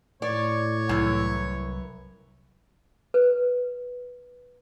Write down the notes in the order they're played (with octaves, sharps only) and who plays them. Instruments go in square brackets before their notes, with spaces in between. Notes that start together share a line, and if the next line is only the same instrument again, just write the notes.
[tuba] A2 [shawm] C#5 [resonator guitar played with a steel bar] D5
[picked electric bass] C2 [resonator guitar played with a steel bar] F#2 E3
[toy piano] B4